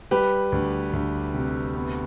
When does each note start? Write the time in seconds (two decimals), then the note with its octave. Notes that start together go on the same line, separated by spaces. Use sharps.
0.11 G3 G4 B4
0.52 D2
0.93 D2
1.34 C3
1.75 B3